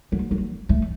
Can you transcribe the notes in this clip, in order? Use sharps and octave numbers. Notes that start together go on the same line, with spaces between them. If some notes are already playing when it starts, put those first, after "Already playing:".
F#3
F#3
A3